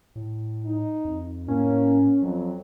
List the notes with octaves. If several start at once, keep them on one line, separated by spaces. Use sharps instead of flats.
A2
D#4
F2
A2 A#3 C#4
F2 F#3